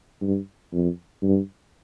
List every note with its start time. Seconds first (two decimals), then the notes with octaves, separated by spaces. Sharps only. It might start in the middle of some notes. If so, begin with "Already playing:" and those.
0.22 G2
0.73 F2
1.23 G2